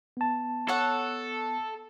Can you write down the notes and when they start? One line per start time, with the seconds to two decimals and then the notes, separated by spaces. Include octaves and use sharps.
0.17 B3 A5
0.68 A4 C#5 F#5